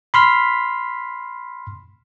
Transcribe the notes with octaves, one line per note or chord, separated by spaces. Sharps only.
B5 C6 F6 B6